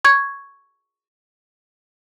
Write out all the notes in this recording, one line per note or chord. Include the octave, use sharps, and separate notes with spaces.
C#6 G#6